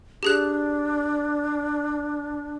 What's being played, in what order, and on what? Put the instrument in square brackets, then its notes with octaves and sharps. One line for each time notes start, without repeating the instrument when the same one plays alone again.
[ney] D4 [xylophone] G4 G#4 F#6